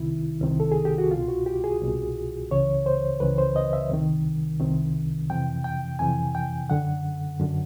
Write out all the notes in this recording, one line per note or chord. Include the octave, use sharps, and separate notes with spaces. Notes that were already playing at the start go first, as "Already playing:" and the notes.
Already playing: C2 C3 D#3 E4
C2 C3 D#3
A4
G#4
G4
F#4
C2 B2 F4
F#4
G4
G#4
C2 B2
C#2 C#3 E3 C#5
C5
C#2 C#3 E3 B4
C5
D#5
E5
C2 C3 D#3
C2 C3 D#3
F2 C3 E3 G5
G5
F2 C3 E3 G#5
G5
F#2 D3 F#5
F#2 D3